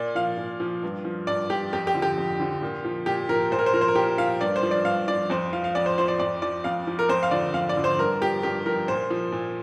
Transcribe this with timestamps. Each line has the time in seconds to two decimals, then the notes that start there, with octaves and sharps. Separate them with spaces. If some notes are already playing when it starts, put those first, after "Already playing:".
Already playing: A#2 D5
0.15 F3 F5
0.38 A#2
0.60 F3
0.83 G2
1.05 F3
1.27 G2 D5
1.50 F3 G4
1.73 F2 G4
1.87 G4
1.94 D3 F3
2.02 G4
2.18 F2
2.40 D3 F3
2.62 A#2
2.85 F3
3.06 A#2 G4
3.29 F3 A#4
3.51 A#2 C5
3.59 A#4
3.66 C5
3.73 F3 A#4
3.81 C5
3.88 A#4
3.95 A#2 G4
4.18 F3 F5
4.41 G2 D5
4.56 C5
4.63 F3
4.71 D5
4.85 G2 F5
5.08 F3 D5
5.30 F2 C5
5.53 F3 F5
5.64 F5
5.75 F2 D5
5.86 C5
5.98 F3 C5
6.08 D5
6.19 F2 D5
6.42 F3 D5
6.64 F2 F5
6.87 F3
6.99 A#4
7.09 F2 C5
7.23 F5
7.31 D3 F3 D5
7.54 F2 F5
7.69 D5
7.77 D3 F3
7.84 C5
7.99 G2 A#4
8.21 F3 G4
8.43 G2 G4
8.66 F3 A#4
8.88 A#2 C5
9.10 F3
9.32 A#2